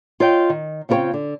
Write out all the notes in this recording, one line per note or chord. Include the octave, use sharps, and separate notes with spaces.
F4 C#5 D#5 G5
D#3
C#3 C4 F4 A#4 C#5 G5
D3